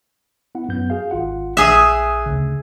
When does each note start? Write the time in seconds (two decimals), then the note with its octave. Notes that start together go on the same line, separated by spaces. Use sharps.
0.55 B3 E4 F#5
0.69 F#2 B3 G6
0.90 F#4 G#4 F5
1.11 G#1 F4 F#5
1.57 A#1 G#4 E5 F#6
2.26 D2 C#3